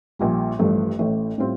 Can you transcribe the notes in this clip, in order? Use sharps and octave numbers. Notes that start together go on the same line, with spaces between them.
A#1 A#2 G3
A1 G2 F3 A3
A1 A2 A3
A2 G3 C4 F4